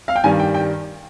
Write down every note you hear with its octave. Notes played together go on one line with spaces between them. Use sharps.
F5
G5
G2 D#3 G3 G#5
G5
G5